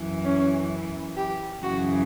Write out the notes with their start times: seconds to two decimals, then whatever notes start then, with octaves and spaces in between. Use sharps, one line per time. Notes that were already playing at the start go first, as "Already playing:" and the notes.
Already playing: F#2 E3
0.25 C#4
1.17 G4
1.63 F#2 C#3 E3 F#4